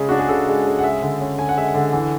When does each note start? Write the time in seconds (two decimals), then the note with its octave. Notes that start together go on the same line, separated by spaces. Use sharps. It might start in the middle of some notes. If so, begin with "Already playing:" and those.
Already playing: C#3 G#3
0.09 D4 F#4
0.19 G#4
0.29 C#3 A4
0.48 G#3
0.66 C#3
0.79 F#5
0.83 G#3 E5
1.02 D3
1.21 C#4
1.38 D3 G#5
1.49 F#5
1.56 G#3 E5
1.68 F#5
1.75 D3
1.93 E3